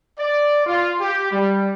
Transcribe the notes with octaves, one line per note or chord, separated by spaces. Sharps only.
D5
F4
G4
G3